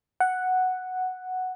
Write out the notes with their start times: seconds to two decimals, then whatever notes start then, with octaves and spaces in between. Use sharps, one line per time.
0.20 F#5